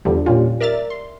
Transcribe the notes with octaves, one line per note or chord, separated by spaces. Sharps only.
E2 D3 F3 G3
A#2 G3 C#4 F4
A#4 D5 E5 F6 A6
C6